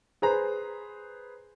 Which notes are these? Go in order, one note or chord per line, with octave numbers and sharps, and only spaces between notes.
G#4 B4 C5 A#5